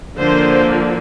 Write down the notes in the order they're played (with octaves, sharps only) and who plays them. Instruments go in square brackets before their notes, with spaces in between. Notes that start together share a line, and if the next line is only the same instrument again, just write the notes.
[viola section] D3 F3 A#3 C5